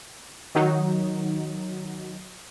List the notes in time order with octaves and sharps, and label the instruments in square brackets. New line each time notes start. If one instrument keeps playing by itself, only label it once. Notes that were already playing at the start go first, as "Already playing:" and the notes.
[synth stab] D#3 F#3 D#4